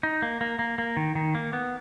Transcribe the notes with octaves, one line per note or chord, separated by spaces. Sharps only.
D#4
A#3
A#3
A#3
A#3
D#3
D#3
A#3
B3